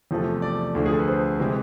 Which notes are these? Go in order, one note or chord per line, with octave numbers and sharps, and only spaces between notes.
E2 C3 F3 A3
D5
D2 D3 F3
G#4
A4
B4
C5
C3 E3 G#3 C5